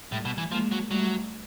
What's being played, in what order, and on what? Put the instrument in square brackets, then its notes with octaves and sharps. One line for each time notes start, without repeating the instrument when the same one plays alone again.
[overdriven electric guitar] A2 [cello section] G3 A3
[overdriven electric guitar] B2
E3
[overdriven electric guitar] F3 [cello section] G#3 A#3
[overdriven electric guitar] F#3
[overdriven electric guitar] F#3 [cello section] G3 A3